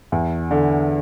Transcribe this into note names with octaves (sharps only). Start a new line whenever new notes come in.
E2
D3